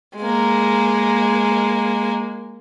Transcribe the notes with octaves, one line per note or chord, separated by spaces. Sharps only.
G#3 A#3